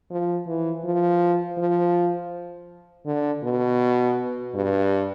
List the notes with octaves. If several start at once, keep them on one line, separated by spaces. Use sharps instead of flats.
F3
E3
F3
F3
D3
B2
G2